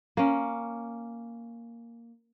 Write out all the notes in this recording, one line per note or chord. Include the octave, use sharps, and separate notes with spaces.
A#3 C#4